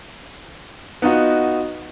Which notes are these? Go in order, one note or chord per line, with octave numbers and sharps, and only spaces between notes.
B3 D#4 F4 F#4 D#5